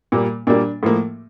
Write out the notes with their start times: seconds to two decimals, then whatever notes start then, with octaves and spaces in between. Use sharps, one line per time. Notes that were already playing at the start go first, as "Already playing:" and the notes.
0.12 A#2 G3 A#3
0.47 A#2 G3 A#3 D4
0.83 A2 F3 A#3